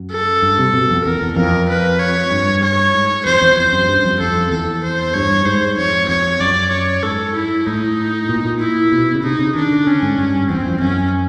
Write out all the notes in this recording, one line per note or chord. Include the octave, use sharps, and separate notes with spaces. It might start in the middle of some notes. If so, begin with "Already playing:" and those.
Already playing: F#2
A4
G2
C3
B2
F2
E2 A#4
E2
F2 A#4
B4
C#5
G2
C#5
G#2
F2 C5
E2
F2 C5
F#2
G2
F2
F2 A4
E2 A4
C5
G2 C#5
G#2 C5
F2 C#5
F2 C#5
F#2 D5
C#5
G#2 A4
E4
A2 D#4
A#2
A#2
E4
B2
C#3
C3 D#4
C#3
D#3 D4
D3
D3 C#4
G#2
G2
E2 C4
F2
F#2 C#4